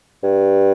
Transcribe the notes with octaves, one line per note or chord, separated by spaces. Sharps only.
G2